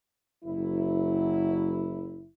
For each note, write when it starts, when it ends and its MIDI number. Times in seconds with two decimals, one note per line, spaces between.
0.44 2.27 30
0.44 2.27 54
0.44 2.27 64